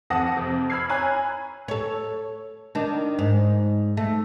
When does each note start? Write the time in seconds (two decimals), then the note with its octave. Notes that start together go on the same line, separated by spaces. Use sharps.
0.10 F2 F#5 A5 D#6 A#6
0.36 F2 C3
0.70 B5 E6 F6 G#6 C7
0.89 C#5 G#5 A#5 B5 F#6
1.68 A4 C#5
2.75 D#3 D4
3.19 G#2
3.97 A3